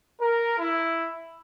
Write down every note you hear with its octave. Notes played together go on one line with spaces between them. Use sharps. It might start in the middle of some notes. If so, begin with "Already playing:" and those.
A#4
E4